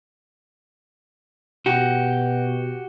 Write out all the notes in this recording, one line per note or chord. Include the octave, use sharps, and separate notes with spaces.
B2 F#4 G4